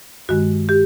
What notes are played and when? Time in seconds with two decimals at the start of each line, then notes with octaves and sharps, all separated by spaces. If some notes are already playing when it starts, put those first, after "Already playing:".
0.29 G2 D#3 G#3 F#4
0.69 G4